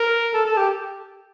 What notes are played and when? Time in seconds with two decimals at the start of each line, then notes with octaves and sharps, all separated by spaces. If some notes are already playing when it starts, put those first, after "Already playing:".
Already playing: A#4
0.34 A4
0.45 A4
0.57 G4